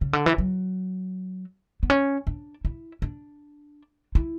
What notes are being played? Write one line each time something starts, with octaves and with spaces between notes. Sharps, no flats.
C#3
D3
E3
F#3
B3
C#4
D4
E4
D4
E4